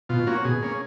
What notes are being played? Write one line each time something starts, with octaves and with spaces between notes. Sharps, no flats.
B2 F4
A#3 C#4 F#4
B2 G#4
A#3 C#4